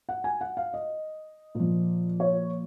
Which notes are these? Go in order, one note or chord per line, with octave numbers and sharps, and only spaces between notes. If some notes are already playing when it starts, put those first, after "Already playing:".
F#5
G#5
F#5
F5
D#5
A#2 F3
C#5